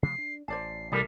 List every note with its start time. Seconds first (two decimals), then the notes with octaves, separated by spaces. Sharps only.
0.03 C3 F3 A3 C7
0.18 D4
0.48 A1 C5 D5 A5 C7
0.92 C2 G3 A4 A#4 D5